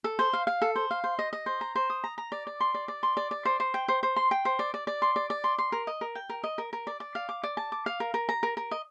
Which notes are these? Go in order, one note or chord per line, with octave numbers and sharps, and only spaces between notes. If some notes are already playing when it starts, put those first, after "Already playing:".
A4
C5
F5
F5
A4
C5
F5
C5
D#5
D#5
C5
A#5
C5
D#6
A#5
A#5
D5
D5
C6
D5
D5
C6
D5
D5
C5
C5
G5
C5
C5
C6
G5
C5
D5
D5
D5
C6
D5
D5
C6
C6
A#4
D#5
A#4
G5
A#4
D#5
A#4
A#4
D5
D5
F5
D6
D5
A5
D6
F5
A#4
A#4
A#5
A#4
A#4
D#5